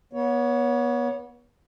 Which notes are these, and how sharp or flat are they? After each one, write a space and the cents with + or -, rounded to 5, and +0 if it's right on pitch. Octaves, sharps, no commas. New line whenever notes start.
B3 -25 C#5 +20